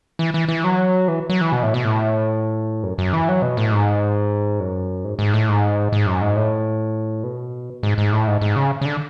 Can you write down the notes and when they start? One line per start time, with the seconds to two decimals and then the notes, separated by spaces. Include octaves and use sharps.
0.19 E3
0.34 E3
0.49 E3
0.64 F#3
1.08 E3
1.29 F#3
1.41 E3
1.52 B2
1.63 A2
1.74 B2
1.85 A2
2.83 F#2
2.98 F#2
3.13 E3
3.28 F#3
3.42 B2
3.57 A2
3.72 G#2
4.60 F#2
5.04 G#2
5.19 G#2
5.34 A2
5.49 G#2
5.92 G#2
6.07 F#2
6.21 G#2
6.36 A2
7.24 B2
7.83 G#2
7.98 G#2
8.13 A2
8.27 G#2
8.41 G#2
8.56 C#3
8.81 C#3
8.85 D3